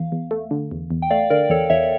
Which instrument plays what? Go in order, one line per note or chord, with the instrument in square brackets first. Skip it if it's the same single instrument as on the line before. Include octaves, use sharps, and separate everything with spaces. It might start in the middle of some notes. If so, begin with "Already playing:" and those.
Already playing: [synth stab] E2 [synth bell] F5
[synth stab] E2
A3
D3
E2
E2
[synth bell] G5
[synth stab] A3 [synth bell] D5 F5
[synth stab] D3 [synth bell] A#4 D5
[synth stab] E2 [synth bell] A4 C#5
[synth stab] E2 [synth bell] C#5 E5